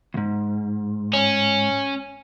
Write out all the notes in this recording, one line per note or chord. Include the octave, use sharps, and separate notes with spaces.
D2 G#2
C#4